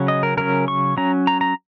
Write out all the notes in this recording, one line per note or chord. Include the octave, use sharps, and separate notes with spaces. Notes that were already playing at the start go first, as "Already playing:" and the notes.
Already playing: C#3 F#3 C#4
D#5
A#4
C#3 F#3 C#4 A#4
C#6
F#3 C#4 A#5
A#5
A#5